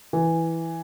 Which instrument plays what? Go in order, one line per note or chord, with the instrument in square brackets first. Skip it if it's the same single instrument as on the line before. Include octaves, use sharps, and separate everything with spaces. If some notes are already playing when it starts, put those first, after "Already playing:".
[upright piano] E3